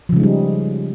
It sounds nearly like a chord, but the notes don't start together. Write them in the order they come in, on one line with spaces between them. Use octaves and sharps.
F3 C#3 G#3 D#4 G3